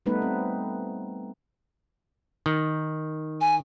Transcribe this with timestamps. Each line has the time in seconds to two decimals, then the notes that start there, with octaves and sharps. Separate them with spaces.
0.06 G3 A3 B3 D#4 B4
0.22 C4
2.46 D#3
3.41 G#5